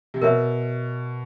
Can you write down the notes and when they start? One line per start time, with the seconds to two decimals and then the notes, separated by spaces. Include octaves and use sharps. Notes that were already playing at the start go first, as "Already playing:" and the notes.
0.14 C3
0.22 B2 A#4 C#5 E5